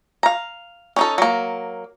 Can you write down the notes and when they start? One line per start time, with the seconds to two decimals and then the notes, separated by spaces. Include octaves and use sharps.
0.23 F5 A#5
0.96 C#4 D#4 A4
1.18 F#3 A#3